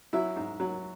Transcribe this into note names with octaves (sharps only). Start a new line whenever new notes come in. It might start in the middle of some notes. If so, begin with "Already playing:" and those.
F#3 E4
G#2
F#3